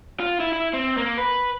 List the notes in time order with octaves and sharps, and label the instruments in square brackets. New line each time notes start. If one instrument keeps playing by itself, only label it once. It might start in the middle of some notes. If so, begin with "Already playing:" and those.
[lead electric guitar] F4
E4
E4
C4
A#3
B4